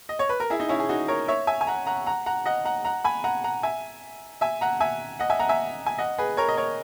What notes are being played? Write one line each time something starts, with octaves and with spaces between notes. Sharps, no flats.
D#5
C#5
B4
A#4
E4 G#4
D#4
C#4 E4
G#4
D#4 F#4
A#4 C#5
C#5 E5
E5 G#5
G#5
F#5 A#5
F#5 A#5
F#5 A#5
F#5 A#5
D#5 F#5
F#5 A#5
F#5 A#5
G#5 B5
F#5 A#5
F#5 A#5
E5 G#5
E5 G#5
F#5 A#5
E5 G#5
D#5 F#5
E5 G#5
F#5 A#5
E5 G#5
G#5
D#5 F#5
G#4 B4
A#4 C#5
D#5
A#4 C#5